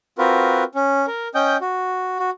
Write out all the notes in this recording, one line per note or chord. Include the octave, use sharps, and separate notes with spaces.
C4 F4 F#4 A#4 B4
C#4
A#4
C#4 D#5 G5 G6
F#4
F#4